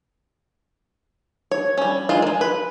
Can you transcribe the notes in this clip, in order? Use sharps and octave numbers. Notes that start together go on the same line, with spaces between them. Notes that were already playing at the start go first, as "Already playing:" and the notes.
C#5
G3 C#4
G#3 F4
G#3 A#3
B4